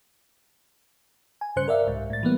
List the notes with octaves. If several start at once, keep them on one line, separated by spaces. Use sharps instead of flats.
G#5
G2 C#3 C5 F#6 C#7
A#4 D5 E5 F5
C2 G#2
A2 A6
E3 G3 A#3 B3